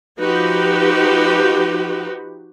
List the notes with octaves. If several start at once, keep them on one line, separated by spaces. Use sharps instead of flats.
F3 D#4 F#4 G4 B4